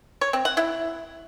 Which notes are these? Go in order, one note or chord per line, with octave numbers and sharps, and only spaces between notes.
C#5
C4
F#5
E4